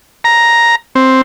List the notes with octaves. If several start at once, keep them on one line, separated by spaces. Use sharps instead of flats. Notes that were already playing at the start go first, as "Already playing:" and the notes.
A#5
C4